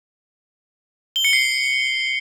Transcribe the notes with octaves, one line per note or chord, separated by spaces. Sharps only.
G7
C#7
C7